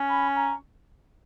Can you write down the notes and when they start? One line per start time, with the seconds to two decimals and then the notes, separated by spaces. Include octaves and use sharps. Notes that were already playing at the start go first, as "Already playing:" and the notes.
Already playing: C#4
0.10 B5
0.36 A#5